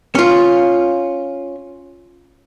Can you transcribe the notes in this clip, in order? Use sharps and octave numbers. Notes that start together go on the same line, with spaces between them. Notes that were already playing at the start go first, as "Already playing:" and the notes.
C#4 F4